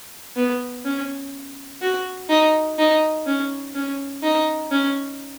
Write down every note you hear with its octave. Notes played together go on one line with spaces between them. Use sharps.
B3
C#4
F#4
D#4
D#4
C#4
C#4
D#4
C#4